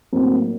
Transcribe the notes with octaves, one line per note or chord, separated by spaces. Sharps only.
A2 F#3 A#3 C4 D#4